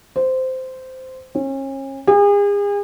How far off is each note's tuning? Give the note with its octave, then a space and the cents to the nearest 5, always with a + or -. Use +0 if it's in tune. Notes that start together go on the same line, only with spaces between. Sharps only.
C5 -10
C#4 -35
G#4 -40